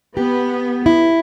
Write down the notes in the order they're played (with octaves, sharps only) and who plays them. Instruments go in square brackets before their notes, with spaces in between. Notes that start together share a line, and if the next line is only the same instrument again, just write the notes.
[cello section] B3 [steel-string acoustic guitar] G4
[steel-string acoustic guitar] E4